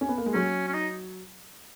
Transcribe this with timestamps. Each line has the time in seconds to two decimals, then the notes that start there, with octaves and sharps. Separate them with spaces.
0.01 C#4
0.08 B3
0.18 A#3
0.26 G#3
0.34 F#3 C#4
0.68 C#4
0.74 D#4